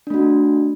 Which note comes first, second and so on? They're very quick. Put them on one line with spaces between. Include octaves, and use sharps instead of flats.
D4 A3 F#4